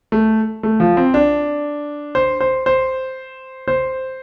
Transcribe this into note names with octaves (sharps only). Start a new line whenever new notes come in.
A3
A3
F3
C4
D4
C5
C5
C5
C5